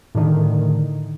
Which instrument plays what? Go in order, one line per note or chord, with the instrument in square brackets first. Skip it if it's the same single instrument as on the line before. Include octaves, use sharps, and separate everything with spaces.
[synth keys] A2 D3 D#3